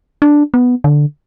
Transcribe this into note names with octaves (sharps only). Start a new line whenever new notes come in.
D4
B3
D3